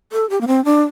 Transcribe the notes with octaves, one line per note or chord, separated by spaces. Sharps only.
A4
G4
A#3
C4
D4